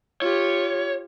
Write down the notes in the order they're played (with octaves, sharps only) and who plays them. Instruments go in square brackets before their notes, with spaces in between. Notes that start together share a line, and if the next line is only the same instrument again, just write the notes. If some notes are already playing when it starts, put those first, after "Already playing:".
[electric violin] F4 G4 [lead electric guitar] C#5